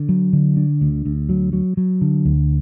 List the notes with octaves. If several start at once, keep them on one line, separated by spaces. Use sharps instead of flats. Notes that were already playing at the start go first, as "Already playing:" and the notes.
Already playing: D3
F#3
D3
D4
D2
D2
F#3
F#3
F#3
D3
D2